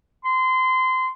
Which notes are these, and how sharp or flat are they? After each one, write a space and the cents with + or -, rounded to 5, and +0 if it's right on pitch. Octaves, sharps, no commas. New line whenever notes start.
C6 -25